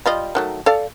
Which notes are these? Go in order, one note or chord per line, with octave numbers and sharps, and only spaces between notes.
G3 F4 D#5
D#3 F#3 A3
A4 D5 F5